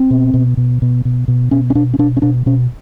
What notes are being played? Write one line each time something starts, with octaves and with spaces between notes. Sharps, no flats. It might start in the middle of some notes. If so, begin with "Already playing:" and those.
Already playing: C4
B2
B2
B2
B2
B2
B2
B2 C#4
C#4
B2 D4
C#4
B2 D4
C#4
B2 D4
B2 C#4